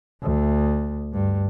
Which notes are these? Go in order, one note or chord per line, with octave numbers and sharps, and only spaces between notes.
D2
G2